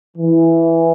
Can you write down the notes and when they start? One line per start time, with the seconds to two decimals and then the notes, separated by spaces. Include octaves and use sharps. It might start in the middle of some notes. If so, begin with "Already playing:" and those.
0.17 E3